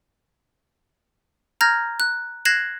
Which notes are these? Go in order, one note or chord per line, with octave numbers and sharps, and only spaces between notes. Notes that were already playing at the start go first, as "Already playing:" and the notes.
A#5 F6 G6 G#6 A#6
F#6
F#6 G#6 A#6 C7 E7 F#7